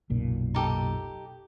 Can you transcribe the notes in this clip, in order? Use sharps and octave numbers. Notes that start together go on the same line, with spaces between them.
F#1 B1 A#2
D#4 G4 A4